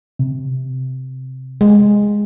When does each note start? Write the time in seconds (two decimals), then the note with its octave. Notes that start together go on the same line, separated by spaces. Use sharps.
0.19 C3
1.61 G#3